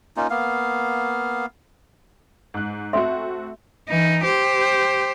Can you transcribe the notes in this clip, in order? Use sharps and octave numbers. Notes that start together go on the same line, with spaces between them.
A#3 C#4 D#4 F4
A#3 B3 F5
G#2 F#6
A3 C4 F#4 E5 C6
E3 D#4
G4 C5